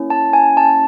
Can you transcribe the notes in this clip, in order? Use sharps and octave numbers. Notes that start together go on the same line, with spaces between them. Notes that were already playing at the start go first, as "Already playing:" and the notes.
Already playing: A#3 C#4 E4
A5
G#5
A5